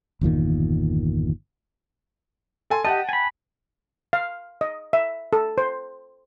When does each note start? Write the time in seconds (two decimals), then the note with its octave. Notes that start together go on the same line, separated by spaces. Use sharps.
0.21 G1 E2 A#2 D#3
2.70 A4 G#5 C6
2.85 G4 D#5 F#5 G5 A5
3.09 G#5 B5
4.13 F5
4.61 D#5
4.93 E5
5.33 A4
5.58 C5